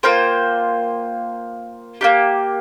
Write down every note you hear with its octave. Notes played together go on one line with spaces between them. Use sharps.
A#3 F4 C5 G5
A#3 D4 G4